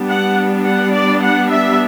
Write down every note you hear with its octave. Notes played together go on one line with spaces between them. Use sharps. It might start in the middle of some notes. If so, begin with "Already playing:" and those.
Already playing: G3 B3 D4
F#5
F#5
D5
F#5
E5